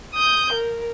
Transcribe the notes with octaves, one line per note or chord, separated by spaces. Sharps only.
D#6 G6
A#4